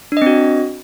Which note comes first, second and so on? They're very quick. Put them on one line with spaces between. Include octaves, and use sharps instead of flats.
D4 D#5 C4 F#4